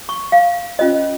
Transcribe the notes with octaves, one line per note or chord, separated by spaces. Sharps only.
C#6
F5
C#4 F4 C5 D#5